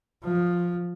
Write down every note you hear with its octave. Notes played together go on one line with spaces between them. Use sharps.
F3